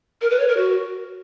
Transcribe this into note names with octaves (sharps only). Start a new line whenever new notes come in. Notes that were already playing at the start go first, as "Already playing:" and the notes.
A#4
B4
C#5
A#4
F#4